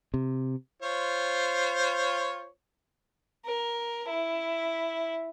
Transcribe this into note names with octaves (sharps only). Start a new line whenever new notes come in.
C3
F4 C5 C#5
A#4
E4